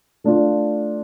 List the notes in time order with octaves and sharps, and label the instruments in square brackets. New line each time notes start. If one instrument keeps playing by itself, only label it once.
[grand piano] A3 D4 F4